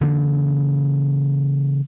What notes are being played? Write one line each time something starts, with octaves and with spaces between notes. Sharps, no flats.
C#3 E3 A#3 D4